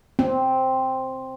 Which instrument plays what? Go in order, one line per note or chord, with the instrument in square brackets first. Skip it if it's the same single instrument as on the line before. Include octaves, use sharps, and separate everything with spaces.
[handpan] C4